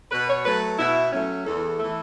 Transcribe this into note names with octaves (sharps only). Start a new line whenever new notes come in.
B2 B4
C#5
F#3 A3 B4
B2 E4
F#3 A3 C#4
E2 A4
E3 A3